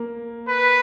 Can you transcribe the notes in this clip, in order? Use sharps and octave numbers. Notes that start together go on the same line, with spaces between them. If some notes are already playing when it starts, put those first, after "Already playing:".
Already playing: A#3
B4